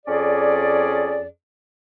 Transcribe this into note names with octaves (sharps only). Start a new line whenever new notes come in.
F2 C#4 G#4 D5